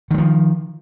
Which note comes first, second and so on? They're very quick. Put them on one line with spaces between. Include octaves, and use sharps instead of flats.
D#3 G3 F3